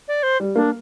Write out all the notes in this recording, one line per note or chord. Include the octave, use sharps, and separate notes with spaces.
D5
C5
G3
A#3 D4